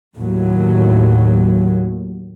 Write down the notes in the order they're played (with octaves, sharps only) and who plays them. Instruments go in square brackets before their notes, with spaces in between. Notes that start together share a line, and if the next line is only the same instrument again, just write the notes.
[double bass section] D#2 A2 F#3